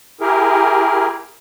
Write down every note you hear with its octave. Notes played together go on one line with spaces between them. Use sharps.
E4 G4 G#4 A#4